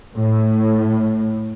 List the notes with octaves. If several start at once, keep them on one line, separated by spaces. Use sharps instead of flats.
A2